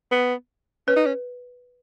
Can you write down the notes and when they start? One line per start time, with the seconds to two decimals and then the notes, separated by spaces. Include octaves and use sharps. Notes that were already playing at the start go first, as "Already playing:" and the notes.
0.11 B3
0.87 C#4 B4
0.96 D#4
1.06 C#4